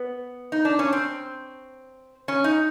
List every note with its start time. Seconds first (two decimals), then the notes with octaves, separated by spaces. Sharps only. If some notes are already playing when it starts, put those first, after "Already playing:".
Already playing: B3
0.52 D#4
0.65 D4
0.79 C#4
0.93 C4
2.28 C#4
2.44 D#4